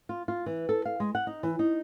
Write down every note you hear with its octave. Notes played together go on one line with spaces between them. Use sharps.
F4
F4
E3
A4
F5
G#3
F#5
D#4
E3
D#4